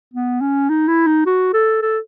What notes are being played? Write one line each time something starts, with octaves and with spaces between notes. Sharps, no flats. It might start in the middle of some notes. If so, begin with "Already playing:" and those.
B3
C#4
D#4
E4
D#4
F#4
A4
A4